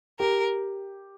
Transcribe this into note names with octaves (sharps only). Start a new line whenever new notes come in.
G4 A#4